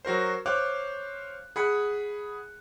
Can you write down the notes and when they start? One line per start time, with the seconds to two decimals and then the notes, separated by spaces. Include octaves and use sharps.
0.05 F#3 F#4 A#4 C5
0.46 C5 C#5 F5 D6 F#6
1.56 G#4 F#5 B5 F#6 C#7